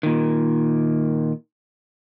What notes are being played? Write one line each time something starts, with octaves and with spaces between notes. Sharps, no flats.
A#2 D#3